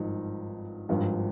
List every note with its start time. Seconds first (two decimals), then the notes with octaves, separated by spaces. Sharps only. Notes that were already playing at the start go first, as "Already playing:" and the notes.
Already playing: G#1 G2 F3 D#4
0.89 G#1 G2 F3